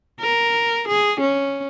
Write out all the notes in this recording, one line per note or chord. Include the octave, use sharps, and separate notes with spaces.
A#4
G#4
C#4